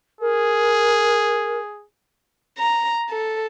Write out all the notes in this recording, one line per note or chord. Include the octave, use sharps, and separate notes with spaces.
G#4 A#4
A#5
A4